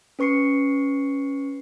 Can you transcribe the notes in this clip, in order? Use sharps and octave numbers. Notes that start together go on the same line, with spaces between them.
C#4 B4 C#6 C7 C#7